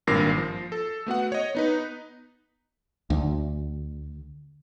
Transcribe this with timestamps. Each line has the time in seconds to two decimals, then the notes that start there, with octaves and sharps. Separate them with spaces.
0.07 G#1 G2 A#2 A#4 A#6 C7
0.38 F3
0.72 A4
1.06 A3 B3 F#4 F#5
1.32 C#5 D#5
1.55 B3 D#4 B4
3.10 D2